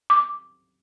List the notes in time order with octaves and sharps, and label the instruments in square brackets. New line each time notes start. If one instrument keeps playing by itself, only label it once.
[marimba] D6